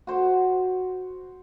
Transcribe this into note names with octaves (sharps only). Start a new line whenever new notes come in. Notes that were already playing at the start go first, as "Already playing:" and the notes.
F#4 C5